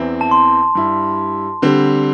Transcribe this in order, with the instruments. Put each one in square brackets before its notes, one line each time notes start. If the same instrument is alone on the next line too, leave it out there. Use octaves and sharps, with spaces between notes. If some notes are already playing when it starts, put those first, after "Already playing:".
Already playing: [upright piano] E2 E3 C4 E4
[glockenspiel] A5
C6
[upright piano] G2 G3 E4
D3 G3 C4